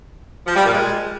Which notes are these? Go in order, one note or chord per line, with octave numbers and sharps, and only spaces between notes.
F3
G3
A#2
G#3